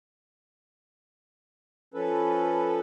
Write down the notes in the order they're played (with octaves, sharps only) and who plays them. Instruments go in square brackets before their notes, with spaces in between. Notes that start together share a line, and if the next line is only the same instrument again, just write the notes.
[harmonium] F3 C#4 A4 B4